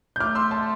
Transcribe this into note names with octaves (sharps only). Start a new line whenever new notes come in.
G6
A3 D6 F6
C6 E6
A5 C6